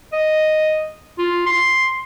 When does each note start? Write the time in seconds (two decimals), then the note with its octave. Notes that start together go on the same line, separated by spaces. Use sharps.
0.13 D#5
1.18 F4
1.46 C6